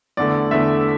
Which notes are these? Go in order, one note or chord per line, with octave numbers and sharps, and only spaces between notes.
E2 D3 A3 D5
E2 D3 A3 E5